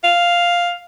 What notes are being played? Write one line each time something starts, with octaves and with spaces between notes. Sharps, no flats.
F5